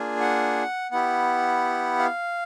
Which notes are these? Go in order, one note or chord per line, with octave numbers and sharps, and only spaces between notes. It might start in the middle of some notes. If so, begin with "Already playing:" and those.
Already playing: A#3 D4 F4 G#4
F#5
B3 E4 G4 F#5
F5